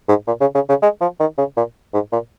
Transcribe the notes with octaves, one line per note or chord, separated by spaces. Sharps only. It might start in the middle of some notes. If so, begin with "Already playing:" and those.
G#2
A#2
C#3
C#3
C#3
G#3
F3
D#3
C#3
A#2
G#2
A#2